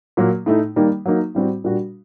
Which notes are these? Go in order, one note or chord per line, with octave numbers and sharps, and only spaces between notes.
A#2 F#3 A#3
A2 A3 D#4
D#3 G3 A#3 D#4
F#3 A#3 D#4
A2 G3 C4 F#4
A#2 G3 D4 F#4